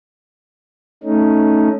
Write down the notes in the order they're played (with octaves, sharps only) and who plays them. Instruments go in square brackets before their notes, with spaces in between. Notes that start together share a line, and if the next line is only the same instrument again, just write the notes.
[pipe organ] A3 C#4 D#4